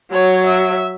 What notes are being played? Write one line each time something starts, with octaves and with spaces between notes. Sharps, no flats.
F#3 C#5
E5